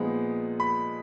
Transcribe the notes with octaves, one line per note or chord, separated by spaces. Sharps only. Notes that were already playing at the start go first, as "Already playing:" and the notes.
Already playing: A#2 F3 G#3 B3 D#4
B5